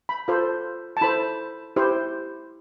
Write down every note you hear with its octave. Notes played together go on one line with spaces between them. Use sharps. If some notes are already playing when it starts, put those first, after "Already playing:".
B5
F4 A4 C5
A5
E4 A4 C5 B5
E4 G4 C5